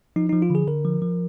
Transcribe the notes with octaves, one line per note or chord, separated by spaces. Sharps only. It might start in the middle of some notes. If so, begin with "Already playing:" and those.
F3 D#4
F3 D#4
F4
D3 G#4
D3 A#4
F3
F3